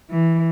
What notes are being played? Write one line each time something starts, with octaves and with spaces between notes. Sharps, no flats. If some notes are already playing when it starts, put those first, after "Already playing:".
E3